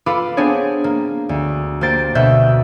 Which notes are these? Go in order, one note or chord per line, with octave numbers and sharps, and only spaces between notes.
F4 A4 B4 F5 B5 D6
B3 C4 D4 G#4 C#5
A#3
D2
A#3 G4 C5 A6 D7
D2 B2 E5 F#6 G6